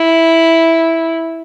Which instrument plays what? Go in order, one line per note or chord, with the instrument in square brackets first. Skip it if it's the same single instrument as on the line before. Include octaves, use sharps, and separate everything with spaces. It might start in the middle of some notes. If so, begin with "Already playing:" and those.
Already playing: [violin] E4